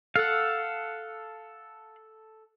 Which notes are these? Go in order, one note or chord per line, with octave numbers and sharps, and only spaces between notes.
A4 F5 F#5